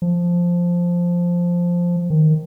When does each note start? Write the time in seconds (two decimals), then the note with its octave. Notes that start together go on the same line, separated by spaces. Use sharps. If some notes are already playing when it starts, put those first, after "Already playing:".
0.02 F3
2.10 D#3